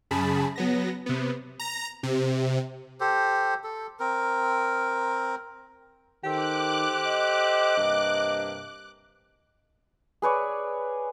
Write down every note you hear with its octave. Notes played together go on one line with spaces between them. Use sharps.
F#2 C#3 G#4 A5 B5
F#3 B3 A#6
C3 B3
A#5
C3
G4 A4 C5
A4
C4 A#4
D#3 G4 A4 C5 D6 F#6
D#5
G2 C3 A#3
G#4 B4 C#5 D5